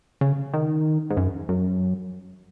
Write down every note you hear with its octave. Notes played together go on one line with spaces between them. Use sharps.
C#3
D#3
G#2
F#2
F#2